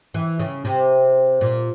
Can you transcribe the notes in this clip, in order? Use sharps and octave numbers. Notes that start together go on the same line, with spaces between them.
E3
C#3
C3
A#2